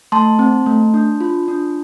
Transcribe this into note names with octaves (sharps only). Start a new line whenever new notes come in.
A3 A5 C6
C4
A3
D4
F4
D4